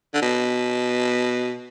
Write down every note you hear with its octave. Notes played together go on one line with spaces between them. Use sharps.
D3
B2